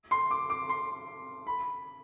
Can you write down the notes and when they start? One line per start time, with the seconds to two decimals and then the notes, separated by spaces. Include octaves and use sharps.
0.11 C6
0.31 D6
0.50 D6
0.69 C6
1.47 B5